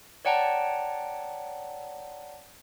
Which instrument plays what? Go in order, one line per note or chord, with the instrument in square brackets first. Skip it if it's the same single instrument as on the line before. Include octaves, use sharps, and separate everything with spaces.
[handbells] C#5 D5 F#5 G5 A5 A#5